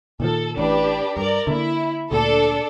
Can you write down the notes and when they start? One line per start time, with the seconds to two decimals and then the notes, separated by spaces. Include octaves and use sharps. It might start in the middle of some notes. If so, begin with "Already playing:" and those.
0.20 A#2 D#3 F3 A4
0.58 A1 D4 G4 B4
1.17 G2 A#4 D5
1.47 D3 A#3 E4
2.11 D2 A#2 D4 A4